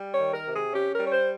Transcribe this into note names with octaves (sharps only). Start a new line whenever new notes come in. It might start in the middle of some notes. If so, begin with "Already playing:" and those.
Already playing: G3
C#5
D#3
A#4
C3
G#4
C#4 G4
A#4
G3
C#5
C5